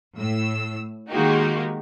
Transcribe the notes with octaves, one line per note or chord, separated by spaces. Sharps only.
A2 E6
D#3 G#3 A#3 D#4 F#4 G4